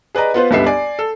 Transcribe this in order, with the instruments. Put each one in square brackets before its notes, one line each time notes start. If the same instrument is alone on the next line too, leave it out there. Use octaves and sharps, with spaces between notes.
[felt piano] G#4 B4 D5 D#5 A#5
B3 F4 B4 C5
G1 C#2 B3 G4 E5 C7
D5 G#5
A4